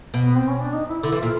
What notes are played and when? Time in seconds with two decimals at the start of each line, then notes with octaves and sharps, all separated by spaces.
0.14 B2
0.21 B3
0.35 C4
0.48 C#4
0.60 D4
0.73 D#4
0.88 E4
1.03 D3 E4
1.12 E3
1.18 A#2 F4